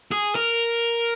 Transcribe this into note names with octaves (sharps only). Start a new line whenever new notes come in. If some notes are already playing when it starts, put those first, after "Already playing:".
G#4
A#4